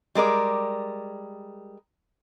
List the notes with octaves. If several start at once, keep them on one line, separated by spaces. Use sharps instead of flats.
G3 G#3 A#4 D5